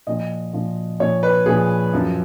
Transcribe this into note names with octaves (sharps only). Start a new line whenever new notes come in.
A#2 F3 D#5
A#2 F3
A#2 F3 C#5
B4
A#2 F3 G#4
F#2 F3